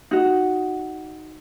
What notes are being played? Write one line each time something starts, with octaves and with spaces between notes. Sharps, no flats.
D#4 F#4